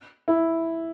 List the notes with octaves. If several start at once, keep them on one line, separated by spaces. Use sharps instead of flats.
E4